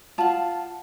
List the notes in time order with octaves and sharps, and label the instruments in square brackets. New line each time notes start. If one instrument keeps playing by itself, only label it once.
[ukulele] F4 A5 [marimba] F5 F#5